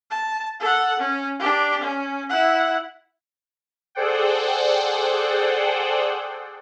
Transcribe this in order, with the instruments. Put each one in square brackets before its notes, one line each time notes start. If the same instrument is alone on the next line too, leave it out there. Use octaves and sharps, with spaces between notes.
[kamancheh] A5
A4 F#5
C#4
D4 G4
C#4
E4 F#5
[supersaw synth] G#4 A4 C5 D5 F#5 G5